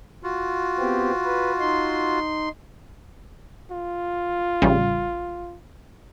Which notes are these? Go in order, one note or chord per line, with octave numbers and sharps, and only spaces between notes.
F4 F#4
B3 C4 G4
B4
D#4 C6
F4
A1 C#3 G3